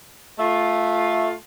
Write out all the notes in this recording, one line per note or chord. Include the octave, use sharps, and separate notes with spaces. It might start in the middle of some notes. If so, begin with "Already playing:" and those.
A3 F4